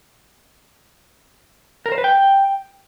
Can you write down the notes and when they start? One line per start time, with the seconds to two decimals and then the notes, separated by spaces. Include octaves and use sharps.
1.86 A#4
1.92 C5
1.98 B4
2.04 G5